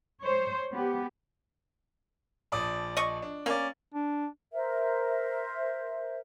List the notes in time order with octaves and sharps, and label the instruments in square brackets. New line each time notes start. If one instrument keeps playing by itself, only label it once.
[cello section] C5 C#5
B3 G4
[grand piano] A#1 D5 D#6
[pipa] D#5 C#6
[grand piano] D4
[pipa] A#3 [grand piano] C#4 D5
[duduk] D4
[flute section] A#4 C5 E5